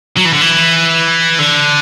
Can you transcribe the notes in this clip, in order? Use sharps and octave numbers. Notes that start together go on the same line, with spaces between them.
F#3
E3
D3
E3
D3